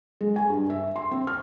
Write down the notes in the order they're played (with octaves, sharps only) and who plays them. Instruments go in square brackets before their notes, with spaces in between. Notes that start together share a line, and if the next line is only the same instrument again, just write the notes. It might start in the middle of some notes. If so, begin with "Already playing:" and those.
[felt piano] G#3
G#5
G2
E5
C6
C4
F6